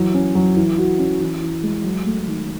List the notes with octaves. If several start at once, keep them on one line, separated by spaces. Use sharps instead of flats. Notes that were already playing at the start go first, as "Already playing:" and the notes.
Already playing: E3 F#3
C#4
F#3
E3
F#4
C#4
E3
E3
G#3
F#3
A3
D#3